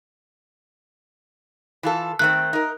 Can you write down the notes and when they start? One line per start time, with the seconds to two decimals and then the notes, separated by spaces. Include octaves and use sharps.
1.83 E3 F4 A4
2.19 D#3 A3 C4 F#6
2.53 D#4 A#4